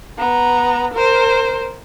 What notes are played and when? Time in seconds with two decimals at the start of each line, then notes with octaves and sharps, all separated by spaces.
0.18 B3 A#5
0.93 A#4 C5